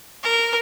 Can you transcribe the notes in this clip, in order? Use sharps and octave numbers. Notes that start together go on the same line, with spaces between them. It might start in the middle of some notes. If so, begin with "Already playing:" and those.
A#4